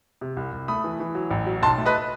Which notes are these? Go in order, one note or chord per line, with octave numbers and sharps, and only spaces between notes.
C3
C2
C2
A3 B5 D#6
E3
E3
F#3
A1
F#3
B1 A5 C6
A3
B4 D#5